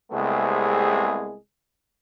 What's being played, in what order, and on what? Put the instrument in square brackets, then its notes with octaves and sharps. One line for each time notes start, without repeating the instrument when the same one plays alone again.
[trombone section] C2 C3 G#3 A3 B3 G#4